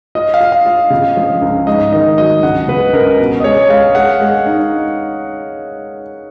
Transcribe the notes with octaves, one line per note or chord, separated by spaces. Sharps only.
F4 D#5
F5
F4
F5
F4
C#3
F3
C#2
G#2 D#5
D#3 D#5
F#3 D#5
C#2 F#5
C#3 B4
C#2 A#4
B2
D#5
G#3 C#5
G#3 F5
G#3 F#5
G#3
D#4